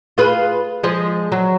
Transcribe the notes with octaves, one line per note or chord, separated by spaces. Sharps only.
F4 G#4 B4
F3 G#3
F#3